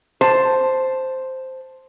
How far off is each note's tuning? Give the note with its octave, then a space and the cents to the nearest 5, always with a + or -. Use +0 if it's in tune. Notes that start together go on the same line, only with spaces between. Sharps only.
C5 +0 A5 +0